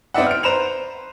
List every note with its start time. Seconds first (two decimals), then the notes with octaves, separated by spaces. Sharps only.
0.14 B3 C4 D#4 D5 E5 F#5
0.27 F6 D7
0.43 B4 C5 A#5 E7 F7